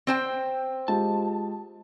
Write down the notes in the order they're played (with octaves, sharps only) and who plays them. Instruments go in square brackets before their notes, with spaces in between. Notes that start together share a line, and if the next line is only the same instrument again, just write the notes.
[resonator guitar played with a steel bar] C4 C5 G5
[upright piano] G#3 F4 G4 [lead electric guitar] A5